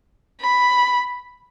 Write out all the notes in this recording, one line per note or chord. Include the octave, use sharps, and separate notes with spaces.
B5